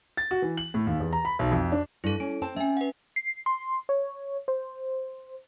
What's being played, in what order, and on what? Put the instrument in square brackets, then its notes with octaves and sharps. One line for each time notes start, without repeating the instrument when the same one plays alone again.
[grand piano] A6
F#4
E3
F#7
A2
D#2
E2
A#5
B5
B1
F2
D4
[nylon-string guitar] G2 [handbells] E4 A4
[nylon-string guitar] C#4 [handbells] D7
[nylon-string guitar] C4 C5 A5
[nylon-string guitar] C4 [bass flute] C#4 [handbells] E5 G#5
[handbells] B4 F#5
[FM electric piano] C7
C6
C#5
C5